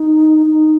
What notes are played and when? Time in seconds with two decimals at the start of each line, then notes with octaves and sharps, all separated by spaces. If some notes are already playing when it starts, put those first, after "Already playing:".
Already playing: D#4
0.46 D#4